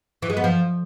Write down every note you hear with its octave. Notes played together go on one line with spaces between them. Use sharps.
E3
G#3
B3
F3